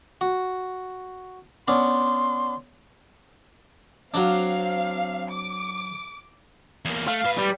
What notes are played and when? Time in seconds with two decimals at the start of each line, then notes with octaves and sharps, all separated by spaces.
0.21 F#4
1.68 B3 C#4 D4 C6
4.14 F#3 C4 D4 F5
5.29 D6
6.85 E2 A#3
7.08 A3 F5
7.25 A2 B4
7.38 G3